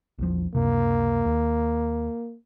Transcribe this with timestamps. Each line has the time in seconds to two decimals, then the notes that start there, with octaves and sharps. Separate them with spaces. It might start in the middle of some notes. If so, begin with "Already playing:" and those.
0.19 A#1 E2 F3
0.55 C#2 F#2 C3 A#3
1.25 D#2